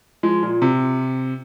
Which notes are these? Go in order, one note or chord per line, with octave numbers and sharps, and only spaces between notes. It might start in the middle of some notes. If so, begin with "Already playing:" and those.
F3 G#3
A#2
C3